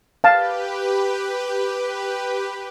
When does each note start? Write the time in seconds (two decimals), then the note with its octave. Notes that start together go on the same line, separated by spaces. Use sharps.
0.24 G4 B4 F5 A5